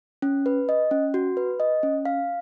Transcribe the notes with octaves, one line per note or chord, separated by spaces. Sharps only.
C#4
B4
D#5
C#4
F#4
B4
D#5
C#4
F5